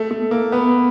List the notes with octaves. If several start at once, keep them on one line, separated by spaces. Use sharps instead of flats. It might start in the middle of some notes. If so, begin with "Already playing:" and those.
Already playing: A3
A3
A#3
B3